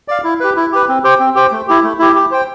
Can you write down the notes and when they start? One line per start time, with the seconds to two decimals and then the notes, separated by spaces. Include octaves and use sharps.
0.08 D5 F5
0.24 E4
0.40 G4 B4
0.56 E4
0.72 G4 B4
0.88 C4
1.04 G4 C5 G5
1.20 C4
1.35 G4 C5 G5
1.51 A3
1.68 E4 G4
1.83 A3
1.99 E4 G4
2.16 G4
2.31 C5 G5